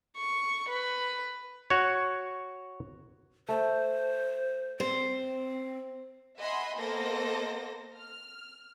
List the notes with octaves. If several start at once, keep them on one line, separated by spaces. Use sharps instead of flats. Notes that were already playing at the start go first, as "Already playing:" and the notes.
C#6
B4
F#4 C#5
A3 C5
C4 C5
D#5 E5 F#5 G#5 B5 C6
A#3 B3 A4 C5 D#5 A#6
F6